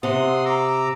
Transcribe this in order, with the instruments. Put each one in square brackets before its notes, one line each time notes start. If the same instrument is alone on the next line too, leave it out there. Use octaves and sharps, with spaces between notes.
[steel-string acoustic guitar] C3 [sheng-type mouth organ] F#5 C6 D#6
[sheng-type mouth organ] A#5 D6 E6